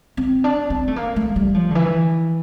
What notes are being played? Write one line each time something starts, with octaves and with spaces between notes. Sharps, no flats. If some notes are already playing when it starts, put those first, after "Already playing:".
C4
D4
C4
A3
A#3
A3
G3
F3
D3
E3